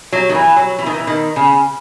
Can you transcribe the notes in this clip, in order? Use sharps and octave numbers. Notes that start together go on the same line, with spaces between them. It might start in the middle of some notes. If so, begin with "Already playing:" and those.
F#3
D#3
E3
F#3
E3
D#3
E3
D#3
C#3